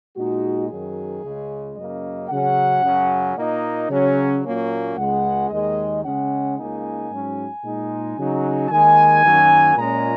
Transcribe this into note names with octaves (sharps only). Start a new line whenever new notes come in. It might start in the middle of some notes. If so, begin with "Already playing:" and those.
A#2 G#3 D#4 F#4
F#2 D#3 F#3 G#4
C#2 C#3 G#3
F#2 C#3 A#3 D#5
C#3 F#3 C#4 F#5
F#2 C#3 F#3 C#4
A#2 A#3 D#4 D#5
C#3 F#3 C#4 C#5
A#2 F#3 A#3 C#4 C#5
C#2 C#3 G#3 F#5
D#2 D#3 G#3 D#5
C#3 G#3 C#4 F#5
C#2 C#3 A#3 D#4 G#5
G#2 F#3 C#4
A#2 G#3 D#4
C#3 F#3 D#4
D#2 D#3 G#3 D#4 G#5
F#2 D#3 F#3 A#3
A#2 G#3 C#4 A#5